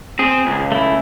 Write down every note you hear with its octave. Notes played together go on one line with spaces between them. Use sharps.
C4 G#4
C#2
A3 E4